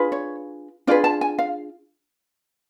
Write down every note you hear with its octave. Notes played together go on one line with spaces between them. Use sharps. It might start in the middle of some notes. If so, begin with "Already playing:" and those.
Already playing: D4 F4 G#4 B4
C#5
D4 F4 G#4 B4 D5
A5
G#5
F5